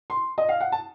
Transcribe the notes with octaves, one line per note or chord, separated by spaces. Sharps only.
C6
D#5
F5
F#5
A5